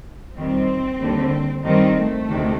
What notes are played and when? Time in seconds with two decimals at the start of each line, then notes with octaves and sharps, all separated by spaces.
0.36 F2 D#3 G3 C4
1.00 D#2 D3 G3
1.64 G2 D#3 G3 C4
1.96 A3
2.28 D2 C3 D#3